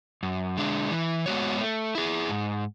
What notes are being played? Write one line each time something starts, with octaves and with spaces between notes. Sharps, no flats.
F#2
D3 G#3 D4
E3
G#3 B3 F#4 C#5
A3
E4 G#4
G#2